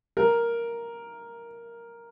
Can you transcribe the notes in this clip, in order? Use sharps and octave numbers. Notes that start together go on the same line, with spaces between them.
A#4